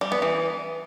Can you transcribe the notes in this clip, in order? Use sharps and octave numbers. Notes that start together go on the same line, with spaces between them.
G3
B3
E3